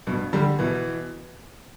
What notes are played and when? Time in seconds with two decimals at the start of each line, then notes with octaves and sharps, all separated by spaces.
0.07 G2 B2
0.33 D3 G3
0.59 B2 E3